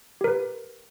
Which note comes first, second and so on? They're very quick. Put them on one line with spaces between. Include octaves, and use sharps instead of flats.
G4 A#4 B4